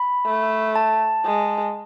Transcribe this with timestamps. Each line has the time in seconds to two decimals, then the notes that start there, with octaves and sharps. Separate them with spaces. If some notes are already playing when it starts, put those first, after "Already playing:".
Already playing: B5
0.26 A3
0.75 A5
1.26 G#3